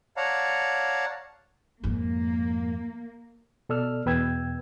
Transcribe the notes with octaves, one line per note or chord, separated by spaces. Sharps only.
C#5 D5 F5 F#5 A5 A#5
F2 G#2 A#3
B2 A4 D5 E6 F6
E2 B2 B4 G5 E6 G#6